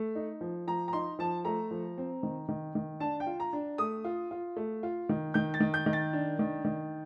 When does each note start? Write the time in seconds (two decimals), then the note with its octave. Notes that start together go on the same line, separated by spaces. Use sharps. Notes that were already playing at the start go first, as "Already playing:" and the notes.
Already playing: A3
0.15 D#4
0.41 F3
0.67 F3 A#5
0.88 A#5
0.93 D#4 C6
1.19 F3 A5
1.45 A3 A#5
1.71 F3
1.98 C4
2.23 D#3
2.48 D#3
2.75 D#3
3.00 D4 A5
3.20 G5
3.27 F4
3.40 A#5
3.53 D4
3.78 A3 D#6
4.05 F4
4.31 F4
4.56 A3
4.83 F4
5.09 D#3
5.34 D#3 G6
5.54 A6
5.60 D#3
5.74 G6
5.86 D#3
5.93 A6
6.13 D4
6.39 D#3
6.65 D#3